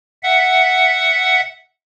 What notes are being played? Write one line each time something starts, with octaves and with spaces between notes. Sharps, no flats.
E5 F#5